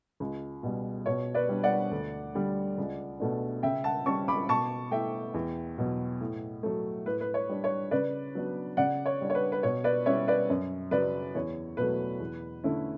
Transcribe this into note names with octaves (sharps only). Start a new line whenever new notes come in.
C#2
B2 G3
B2 C#5
B4 D5
G3 D4
D5 F#5
D2
D3 G3
C#2
B2 A3 D4
C#3 E5 G5
F#5 A5
G3 C#4 A5 C#6
B5 D6
B2 A5 C#6
A3 E4 E5 G5
E2
B2 F#3
A2
F#3 A3
A2 B4
B4
C#5
G3 D4
C#5
C#3 B4 D5
F#3 B3 D4
C#3 D5 F#5
C#5
G3 D4
C#5
B4
B4
B2 C#5
B4 D5
G3 C#4 E4 C#5 E5
B4 D5
F#2
C#3 F#3 B4 D5
E2 C#5
B2 F#3 A3 B4
E2
D3 A3 C#4 E4